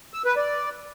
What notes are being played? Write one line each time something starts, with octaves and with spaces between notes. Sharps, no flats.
E6
B4
D5